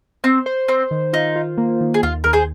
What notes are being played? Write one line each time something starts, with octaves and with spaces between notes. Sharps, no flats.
C4 C5
C5
C4 C5
D#3
D#4 F4
F4
A#3
D#3
G#4
D#2 F4
D#2 A#4
G#4 C5